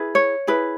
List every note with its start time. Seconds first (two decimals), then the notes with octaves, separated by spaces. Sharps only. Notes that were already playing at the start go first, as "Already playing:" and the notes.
Already playing: E4 G#4 B4
0.15 C#5
0.47 E4 G#4 B4